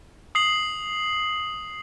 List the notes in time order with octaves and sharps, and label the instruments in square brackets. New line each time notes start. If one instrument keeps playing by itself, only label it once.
[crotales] D#6 C7 F#7